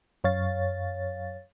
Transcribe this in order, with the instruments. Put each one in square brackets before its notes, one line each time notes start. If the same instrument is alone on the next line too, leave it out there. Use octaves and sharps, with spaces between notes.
[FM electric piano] F#2 C#5 F5 A6